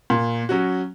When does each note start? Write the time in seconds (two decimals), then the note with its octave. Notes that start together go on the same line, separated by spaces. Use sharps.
0.10 A#2
0.49 F#3 C#4 F#4